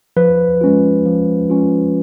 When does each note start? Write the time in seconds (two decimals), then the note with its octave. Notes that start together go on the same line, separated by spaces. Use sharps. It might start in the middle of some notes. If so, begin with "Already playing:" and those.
0.17 F3 B4
0.61 G#3 C#4 F4
1.06 F3
1.50 G#3 C#4 F4